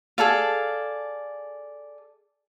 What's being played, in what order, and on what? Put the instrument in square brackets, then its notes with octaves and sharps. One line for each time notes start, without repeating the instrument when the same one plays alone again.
[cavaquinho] G#4 A4 D5 F5